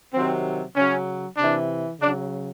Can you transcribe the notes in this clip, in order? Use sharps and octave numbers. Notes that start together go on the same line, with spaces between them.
C3 D#3 F#3 C4
C#3 F#3 C#4
C3 E3 D4
C#3 F#3 D4